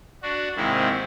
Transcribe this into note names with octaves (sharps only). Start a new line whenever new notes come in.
D4 F#4
G#2 C3 D#3 A#3 C4 E4